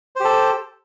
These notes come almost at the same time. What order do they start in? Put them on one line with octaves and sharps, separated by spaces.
C5 G4 A4